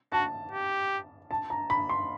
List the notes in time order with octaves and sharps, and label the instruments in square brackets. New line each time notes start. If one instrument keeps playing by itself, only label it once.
[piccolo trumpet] F#4 [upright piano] A5
[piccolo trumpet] G4
[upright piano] A5
A#5
B5
C6